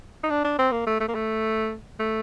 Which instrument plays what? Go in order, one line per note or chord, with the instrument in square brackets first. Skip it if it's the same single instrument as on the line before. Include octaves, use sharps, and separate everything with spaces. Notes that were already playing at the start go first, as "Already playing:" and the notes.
[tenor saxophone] D#4
D4
D4
C4
A#3
A3
A3
A#3
A3
A3